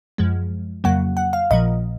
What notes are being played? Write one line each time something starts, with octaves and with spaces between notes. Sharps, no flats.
F#2 F3 G#3
F2 C#3 F#3 A#3 F#5
F#5
F5
A#1 A#2 F3 D#5